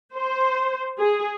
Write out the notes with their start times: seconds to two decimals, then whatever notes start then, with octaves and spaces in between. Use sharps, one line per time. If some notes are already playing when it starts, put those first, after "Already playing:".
0.14 C5
0.99 G#4